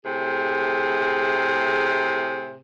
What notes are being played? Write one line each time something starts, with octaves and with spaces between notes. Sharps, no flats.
A2 C3 G#4